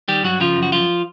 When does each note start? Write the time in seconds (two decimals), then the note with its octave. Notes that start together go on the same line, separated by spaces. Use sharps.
0.08 D#3 G3 G4
0.24 G2 F#3 F#4
0.40 C#3 F3 F4
0.56 F#2
0.63 F#4
0.72 F#2 F3 F4